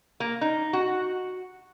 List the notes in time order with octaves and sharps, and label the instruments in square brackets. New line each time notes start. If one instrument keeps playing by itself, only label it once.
[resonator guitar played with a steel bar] A#3
D#4
F#4